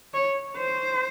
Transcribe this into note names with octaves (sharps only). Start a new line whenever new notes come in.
C#5
C5